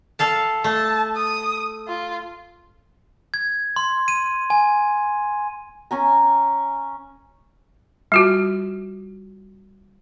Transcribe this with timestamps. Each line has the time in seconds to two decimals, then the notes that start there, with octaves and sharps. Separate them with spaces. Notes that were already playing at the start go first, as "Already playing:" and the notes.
0.19 A4 F5 A5
0.64 A3 A5
1.16 D#6
1.88 F4
3.34 G#6
3.76 C6
4.08 D#7
4.50 G#5
5.91 C#4 G#5 A#5
8.12 G3 F4 F#4